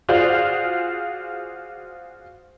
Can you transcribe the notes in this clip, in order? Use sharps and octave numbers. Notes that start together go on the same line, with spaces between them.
F4 F#4 G#4 C5 D5 F5